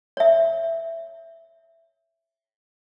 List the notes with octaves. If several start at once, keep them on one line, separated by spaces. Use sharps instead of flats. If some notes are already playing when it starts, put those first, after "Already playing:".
C#5 E5